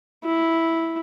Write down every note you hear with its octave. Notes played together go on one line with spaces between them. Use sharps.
E4